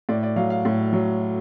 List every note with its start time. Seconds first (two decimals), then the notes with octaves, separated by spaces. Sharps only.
0.09 A2 D5
0.23 D5
0.36 F#3 F5
0.50 F5
0.65 A2
0.93 F#3